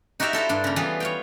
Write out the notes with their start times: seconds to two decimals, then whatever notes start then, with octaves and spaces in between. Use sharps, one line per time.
0.20 D#4 F#4 G4 D5 E5 F5
0.33 E4 A4 C5 F5
0.49 G2 D4
0.64 C#3 A#3
0.76 E3 G3 B3 F4 G#4
1.00 C#5 F5 G5